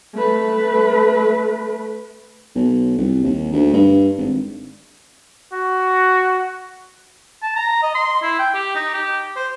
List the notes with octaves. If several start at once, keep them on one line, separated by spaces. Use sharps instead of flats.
A3 B4
B1
C2
D#2
D2
G2
G#1
F#4
A5
A#5
D#5
C6
E4
G5
G4
D#4
G4
C5